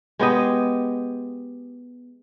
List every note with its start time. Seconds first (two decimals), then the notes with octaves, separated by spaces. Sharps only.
0.19 G#3 B3 G4 D#5